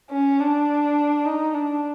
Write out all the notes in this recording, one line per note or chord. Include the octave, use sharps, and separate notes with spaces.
C#4
D4
D#4
D4